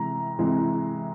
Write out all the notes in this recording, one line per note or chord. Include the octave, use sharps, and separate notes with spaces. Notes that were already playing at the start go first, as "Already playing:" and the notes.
Already playing: C3 E3 G#3 A#5
C3 E3 G#3